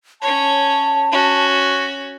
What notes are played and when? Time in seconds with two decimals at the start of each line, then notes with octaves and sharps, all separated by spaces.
0.22 C#4 C#5 A5
1.12 C#4 F#4